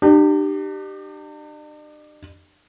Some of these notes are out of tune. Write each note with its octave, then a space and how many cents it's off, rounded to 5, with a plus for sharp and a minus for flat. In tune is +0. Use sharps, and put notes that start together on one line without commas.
D4 +45 G4 -10